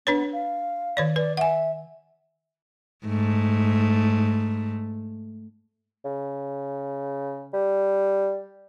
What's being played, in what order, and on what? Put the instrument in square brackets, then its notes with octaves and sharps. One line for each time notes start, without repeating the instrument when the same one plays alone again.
[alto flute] B3 [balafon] D4 B4 C#5
[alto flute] F5
[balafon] D#3 C#5 D5
[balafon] B4 [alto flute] D5
[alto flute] E5 [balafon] F#5 G#5
[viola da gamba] G#2 A3
[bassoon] C#3
G3